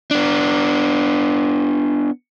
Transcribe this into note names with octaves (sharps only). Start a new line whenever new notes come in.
B3 D4